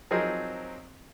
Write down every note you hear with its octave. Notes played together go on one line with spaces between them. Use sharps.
F3 F#3 C4 D#4 G#4 A#4